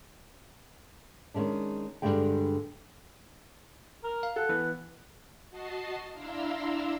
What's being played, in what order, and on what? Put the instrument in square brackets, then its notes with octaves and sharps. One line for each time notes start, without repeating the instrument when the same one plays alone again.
[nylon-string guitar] D#3 G#3 C#4 D4
G2 D3 F3 G3 G#3 G5
[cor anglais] A#4
[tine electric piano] F5
[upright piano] A4 [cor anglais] F#5
[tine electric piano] E3 [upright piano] B3
[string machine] F#4 D#5 A5 C7
D4 E4 F5 A#5 C6 E6